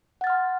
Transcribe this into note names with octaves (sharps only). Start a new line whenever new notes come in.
F#5 C6 F6 A6